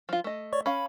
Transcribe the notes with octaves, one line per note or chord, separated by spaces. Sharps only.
F3 F4
A3 D#5
C#5 D5 C#6
C#4 F5 B5